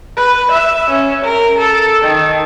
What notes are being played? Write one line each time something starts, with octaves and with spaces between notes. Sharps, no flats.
B4
E5
C#4
A#4
A4
D#3